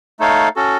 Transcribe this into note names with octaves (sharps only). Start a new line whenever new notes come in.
A3 D#4 A4 C#5 F5
C#4 F#4 A4